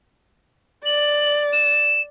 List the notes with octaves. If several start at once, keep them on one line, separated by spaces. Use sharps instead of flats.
D5 F#7
E7